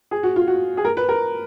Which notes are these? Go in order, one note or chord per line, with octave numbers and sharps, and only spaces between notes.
G#4
F#4
F4
F#4
G#4
A#4
B4
A#4